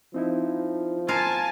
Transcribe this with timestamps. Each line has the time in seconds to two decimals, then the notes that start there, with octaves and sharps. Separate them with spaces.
0.14 F3 C4 D#4 E4
1.08 F4 A#4 F5 G#5 A5